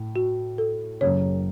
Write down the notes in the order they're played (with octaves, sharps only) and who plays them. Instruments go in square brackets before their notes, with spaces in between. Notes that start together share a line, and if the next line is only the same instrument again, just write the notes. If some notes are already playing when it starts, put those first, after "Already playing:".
Already playing: [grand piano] A2
[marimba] F#4
A4
[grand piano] F#1 F#2 C#3 [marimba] C#5